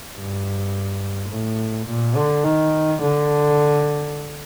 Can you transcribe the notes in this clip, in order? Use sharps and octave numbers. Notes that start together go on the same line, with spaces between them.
G2
A2
A#2
D3
D#3
D3